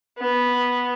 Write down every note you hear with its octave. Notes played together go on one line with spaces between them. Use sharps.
B3